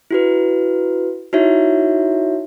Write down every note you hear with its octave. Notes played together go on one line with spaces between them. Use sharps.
E4 F#4 B4
D#4 E4 F#4 C#5 E5